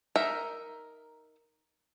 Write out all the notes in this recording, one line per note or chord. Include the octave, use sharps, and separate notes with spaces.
D#4 A#4 E5